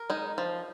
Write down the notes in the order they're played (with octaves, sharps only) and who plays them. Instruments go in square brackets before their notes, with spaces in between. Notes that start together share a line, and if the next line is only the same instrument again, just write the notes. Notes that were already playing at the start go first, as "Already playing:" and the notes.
Already playing: [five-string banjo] A#4
G#3 D#4
F3